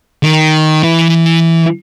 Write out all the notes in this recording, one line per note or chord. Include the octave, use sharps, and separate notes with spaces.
D#3
E3